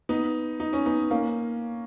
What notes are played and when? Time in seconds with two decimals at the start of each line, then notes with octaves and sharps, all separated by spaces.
0.09 B3 D#4
0.60 D#4
0.73 C#4
0.86 B3 D#4
1.11 A#3 C#4